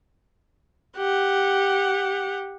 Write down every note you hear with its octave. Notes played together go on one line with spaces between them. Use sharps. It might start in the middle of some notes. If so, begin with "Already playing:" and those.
G4 F#5